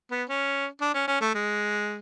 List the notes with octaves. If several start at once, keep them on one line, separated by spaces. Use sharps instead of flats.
B3
C#4
D4
C#4
C#4
A3
G#3